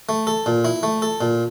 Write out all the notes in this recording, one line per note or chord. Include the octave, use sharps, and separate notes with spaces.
A3
A4
A#2
E4
A3
A4
A#2